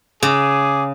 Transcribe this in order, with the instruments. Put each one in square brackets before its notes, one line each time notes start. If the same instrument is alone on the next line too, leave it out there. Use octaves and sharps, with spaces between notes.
[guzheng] C#3 [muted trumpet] G#4 [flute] D6